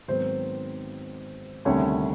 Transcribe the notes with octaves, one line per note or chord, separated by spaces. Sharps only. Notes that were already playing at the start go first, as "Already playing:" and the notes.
G#2 D#3 F#3 B3 C4 C5
D2 C3 D#3 G3 C#4 C#5